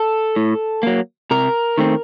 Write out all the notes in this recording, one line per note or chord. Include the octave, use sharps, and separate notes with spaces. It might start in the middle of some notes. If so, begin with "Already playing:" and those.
Already playing: A4
A2
F#3 A#3
C3 A#4
D#3 A3 C4